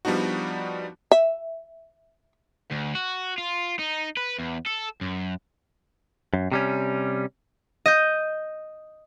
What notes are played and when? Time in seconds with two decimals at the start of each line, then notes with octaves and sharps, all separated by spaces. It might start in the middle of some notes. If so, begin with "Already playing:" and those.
0.05 F3 G3 B3 D4 D#4 F#4
1.11 E5
2.71 D2
2.95 F#4
3.38 F4
3.79 D#4
4.17 B4
4.38 E2
4.66 A4
5.01 F#2
6.34 F#2
6.52 C3 G3 C#4
7.86 D#5 G6